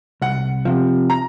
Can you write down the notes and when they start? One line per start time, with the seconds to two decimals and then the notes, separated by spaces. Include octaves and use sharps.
0.22 C2 F#5
0.65 C3 F3
1.10 A#5